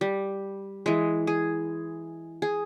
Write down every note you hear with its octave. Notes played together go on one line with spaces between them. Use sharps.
G3
E3 G#3
G#4
G#4